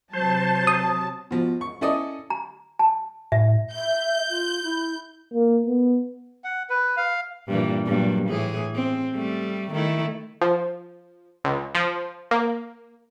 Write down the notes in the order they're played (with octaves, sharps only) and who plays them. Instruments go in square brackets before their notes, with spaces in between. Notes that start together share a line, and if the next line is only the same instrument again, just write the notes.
[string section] C3 F#3 A5 [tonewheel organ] C5
[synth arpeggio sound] D#6
[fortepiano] B2 F3
C#6
C#4 E4 A4 D5 D#5
[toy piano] A#5
A5
[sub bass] A2 [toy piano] E5
[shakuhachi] E5 [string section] G6
[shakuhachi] F4
E4
[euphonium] A#3
B3
[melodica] F#5
B4
F5
[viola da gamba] G2 A#2 E3
G2 A#2 F#3
A2 E3 G#4
C4
G3 A3
D#3 A3 E4
[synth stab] F3
C#2
F3
A#3